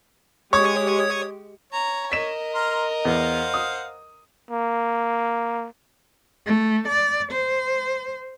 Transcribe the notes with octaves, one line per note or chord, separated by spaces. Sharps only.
G#3 G4 C#5 C#6 D#6 G#6
C#5 A#5
A#4 D#5 B6 E7
A#5 C6 F6
E2 C5 F5 F#5
D#6
A#3
A3
D5
C5